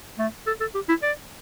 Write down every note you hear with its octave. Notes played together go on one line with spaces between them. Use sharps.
A3
A4
A4
G4
E4
D5